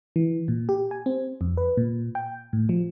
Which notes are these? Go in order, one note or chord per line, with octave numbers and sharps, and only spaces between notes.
E3
A#2
G4
G#5
C4
F2
B4
A#2
G5
A2
F3